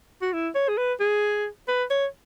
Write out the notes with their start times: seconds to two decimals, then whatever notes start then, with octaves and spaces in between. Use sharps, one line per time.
0.22 F#4
0.33 E4
0.55 C#5
0.69 G#4
0.78 B4
1.00 G#4
1.68 B4
1.90 C#5